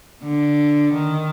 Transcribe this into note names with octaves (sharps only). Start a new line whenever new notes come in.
D3
D#3